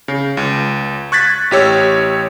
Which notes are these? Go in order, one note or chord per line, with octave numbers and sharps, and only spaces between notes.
C#3
C#2
C#6 F#6 G#6 A6 B6
A1 G4 C#5 E6